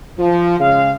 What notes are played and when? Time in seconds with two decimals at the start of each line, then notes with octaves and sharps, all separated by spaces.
0.19 F3
0.60 C#3 G#3 F5